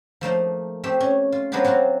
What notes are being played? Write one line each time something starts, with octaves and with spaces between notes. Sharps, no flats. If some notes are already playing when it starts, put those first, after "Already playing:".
F3 A3 A#3 D#4
A3 C4 G4
C#4
F4
F#3 G#3 B3 C4 D4 G4
F#3 C4 F4 F#4